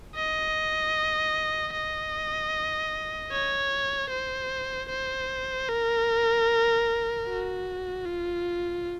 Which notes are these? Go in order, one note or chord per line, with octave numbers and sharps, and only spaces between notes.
D#5
D#5
C#5
C5
C5
A#4
F#4
F4